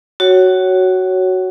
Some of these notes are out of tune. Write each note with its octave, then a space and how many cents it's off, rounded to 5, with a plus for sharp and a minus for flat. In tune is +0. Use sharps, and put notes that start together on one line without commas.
F#4 +10 C#5 +0 F#5 +30